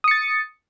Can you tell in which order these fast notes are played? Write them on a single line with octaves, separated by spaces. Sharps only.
D#6 C#7 A6